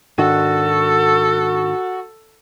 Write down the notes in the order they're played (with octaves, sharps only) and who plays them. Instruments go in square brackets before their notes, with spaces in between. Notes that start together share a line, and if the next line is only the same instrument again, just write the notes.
[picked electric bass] G#2 D#3 D4 [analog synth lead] F#4 [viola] A4